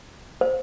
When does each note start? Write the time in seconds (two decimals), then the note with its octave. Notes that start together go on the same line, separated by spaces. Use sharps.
0.41 C5